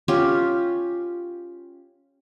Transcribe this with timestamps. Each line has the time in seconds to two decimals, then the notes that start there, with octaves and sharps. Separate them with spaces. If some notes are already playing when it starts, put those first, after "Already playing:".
0.08 C#4 F4 G4